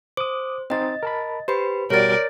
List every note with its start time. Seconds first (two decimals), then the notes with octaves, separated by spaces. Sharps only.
0.17 C5 D6 D#6
0.70 C4 D#4 C5 D#5 A6
1.03 A#4 A5 B5
1.48 G4 B4 C5 B5
1.90 B2 G3 F#4 A#4 C#5 D5 A6